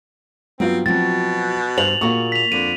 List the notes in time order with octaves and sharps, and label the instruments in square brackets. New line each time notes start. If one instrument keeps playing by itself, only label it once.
[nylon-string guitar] G2 [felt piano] F#3 B3 F4 [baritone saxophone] C4
[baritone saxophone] B2 [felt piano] F3 F#3 [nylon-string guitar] C4 F#4 [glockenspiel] A6
[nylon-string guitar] G2 [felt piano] C5 [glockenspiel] F7 F#7
[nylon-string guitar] A#2 F#4 G#4 [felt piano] A#3 C#6
[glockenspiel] B6 F7
[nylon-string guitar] F2 [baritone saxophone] D3 [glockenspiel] D#7